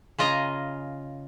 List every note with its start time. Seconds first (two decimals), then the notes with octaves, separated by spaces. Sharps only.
0.18 C#3 F4 D#5 G#5 A#5